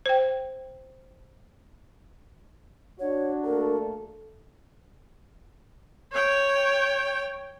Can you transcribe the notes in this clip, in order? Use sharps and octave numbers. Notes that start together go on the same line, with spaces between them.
C5 G5
D4 F#4 C#5
A3 A#3 A4 A#4
C#5 G5